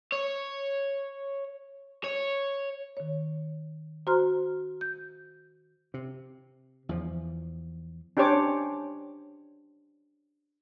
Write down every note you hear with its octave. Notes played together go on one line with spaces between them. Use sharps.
C#5
C#5
D#3 C#5
F#4 C5 A#5 C6 F6
G6
C3
E2 F3
C#4 D4 G4 C5 C#5 D6